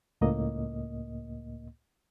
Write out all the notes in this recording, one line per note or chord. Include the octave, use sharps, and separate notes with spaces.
C#2 A2 A#3 D#5